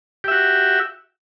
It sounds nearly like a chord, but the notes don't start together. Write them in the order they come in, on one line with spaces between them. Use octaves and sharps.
G4 E5 F#4